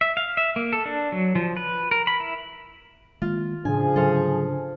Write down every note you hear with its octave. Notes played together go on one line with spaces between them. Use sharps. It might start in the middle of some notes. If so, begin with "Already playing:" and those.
E5
F5
E5
A#3
A4
D4
F#3
F3
B4
A#4
B5
E4
D#3 G#3 A#3 F4
A2 C#3 F3 D4 G#4 G#5
G#2 D3 F#3 A4 C5 F5